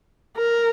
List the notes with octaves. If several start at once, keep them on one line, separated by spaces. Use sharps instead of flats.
A#4